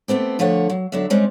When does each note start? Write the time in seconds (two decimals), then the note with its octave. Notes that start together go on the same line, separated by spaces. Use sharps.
0.08 A3 B3 C4 G4
0.39 D3 F3 A3 C#5 F#5
0.70 F#3
0.92 D3 F#3 E5
1.10 G3 G#3 C4 C#4